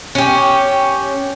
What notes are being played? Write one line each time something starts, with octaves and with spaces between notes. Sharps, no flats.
C#4 G4